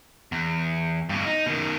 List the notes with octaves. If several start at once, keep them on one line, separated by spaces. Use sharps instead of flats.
E2
G2 B2
D#4
B2 D#3